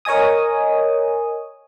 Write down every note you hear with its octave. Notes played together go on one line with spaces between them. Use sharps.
A#4 C#5 D#5 G#5 D#6